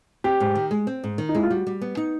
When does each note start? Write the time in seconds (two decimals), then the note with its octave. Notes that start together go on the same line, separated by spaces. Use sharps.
0.24 C4 G4
0.40 G#2
0.55 D#3
0.71 G#3
0.87 C4
1.04 G#2
1.18 D#3
1.29 D#4
1.35 G#3 E4
1.43 F4
1.50 G3 F#4
1.67 G3
1.81 B3
1.97 D#4